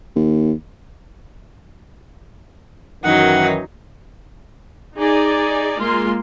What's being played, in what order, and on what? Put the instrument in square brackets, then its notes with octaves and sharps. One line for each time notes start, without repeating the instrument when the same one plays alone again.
[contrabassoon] D#2
[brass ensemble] F#2 D#3 E3 [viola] F#3 D#4 [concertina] F#5
[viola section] D#4 G#4 D5
G#3 A#3 F4 C6